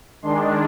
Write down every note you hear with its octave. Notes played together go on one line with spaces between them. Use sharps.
D#3 G#3 D4 C6